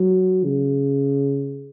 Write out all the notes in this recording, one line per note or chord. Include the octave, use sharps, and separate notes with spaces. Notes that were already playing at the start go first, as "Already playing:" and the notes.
Already playing: F#3
C#3